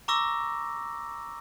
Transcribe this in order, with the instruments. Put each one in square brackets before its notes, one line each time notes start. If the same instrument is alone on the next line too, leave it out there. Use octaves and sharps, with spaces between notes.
[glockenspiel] A#5 C#6 D6 E6 A#6